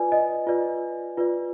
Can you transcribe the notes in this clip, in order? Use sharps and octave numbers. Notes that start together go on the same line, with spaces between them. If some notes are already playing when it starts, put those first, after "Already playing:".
Already playing: F4 B4 D5 G#5
D#5
F4 B4 D5
F4 B4 D5